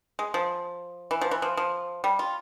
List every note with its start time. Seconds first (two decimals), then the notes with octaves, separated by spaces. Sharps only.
0.19 G#3
0.34 F3
1.11 E3
1.21 F3
1.31 E3
1.42 F3
1.57 F3
2.04 G3
2.19 F4